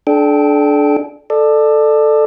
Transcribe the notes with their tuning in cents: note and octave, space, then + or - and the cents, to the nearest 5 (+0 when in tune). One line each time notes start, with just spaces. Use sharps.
D4 +0 A4 -35 G5 -5
A4 +0 D5 +25